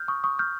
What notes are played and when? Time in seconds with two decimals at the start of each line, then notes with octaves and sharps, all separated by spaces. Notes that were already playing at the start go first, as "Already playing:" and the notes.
Already playing: F6 G6
0.08 C#6 D#6
0.24 C#6 D#6
0.39 F6 G6